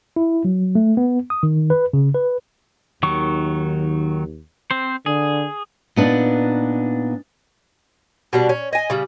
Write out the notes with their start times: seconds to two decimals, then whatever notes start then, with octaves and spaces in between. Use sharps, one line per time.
0.16 E4
0.45 F#3
0.75 A3
0.97 B3
1.30 D#6
1.43 D#3
1.70 B4
1.93 C#3
2.14 B4
3.03 D#2 D#3 F#3 C#6
4.71 C4 C5
5.06 D3 G#4
5.96 A#2 B3 D4 D#4
8.33 B2 G3 D4
8.49 C#4
8.73 D#5 G#5
8.90 C#3 G3